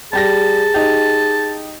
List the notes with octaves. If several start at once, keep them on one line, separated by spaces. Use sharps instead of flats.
G3 G4 G#4 A5 A#6
D#4 G4